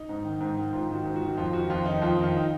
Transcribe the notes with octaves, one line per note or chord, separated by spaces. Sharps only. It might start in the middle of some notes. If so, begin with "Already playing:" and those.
Already playing: D#4
G#2
D#3
G#2
D#3
G#2 F4
D#3
F#4
G#2
F#4
D#3
F2 F4
D#3 F#4
F2 F4
D#3 D#4
F2 F4
D#3
F4
D#4